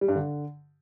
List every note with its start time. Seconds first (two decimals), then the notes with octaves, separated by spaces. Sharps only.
0.01 G3
0.08 G2
0.16 D3